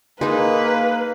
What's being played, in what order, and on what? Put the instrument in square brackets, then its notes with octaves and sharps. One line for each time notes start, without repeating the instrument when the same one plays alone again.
[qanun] G#3 D#4 [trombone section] A#3 [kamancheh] B4